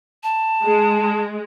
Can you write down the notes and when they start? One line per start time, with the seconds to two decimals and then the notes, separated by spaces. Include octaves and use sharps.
0.23 A5
0.62 G#3